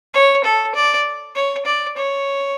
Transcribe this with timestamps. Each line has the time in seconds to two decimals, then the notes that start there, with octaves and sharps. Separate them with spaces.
0.14 C#5
0.44 A4
0.75 D5
1.35 C#5
1.66 D5
1.97 C#5